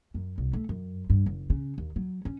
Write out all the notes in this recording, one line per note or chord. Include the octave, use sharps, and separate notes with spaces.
F#2
C2
A3
F#2
G2
F#1
C#3
D#2
F#3
C#4